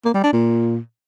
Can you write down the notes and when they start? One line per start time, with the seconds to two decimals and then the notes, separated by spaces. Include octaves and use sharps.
0.05 A#3
0.14 G3
0.24 D4
0.33 A#2